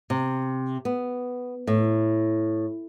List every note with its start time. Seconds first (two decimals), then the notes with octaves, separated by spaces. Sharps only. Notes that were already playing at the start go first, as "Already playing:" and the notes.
0.10 C3
0.85 B3
1.67 A2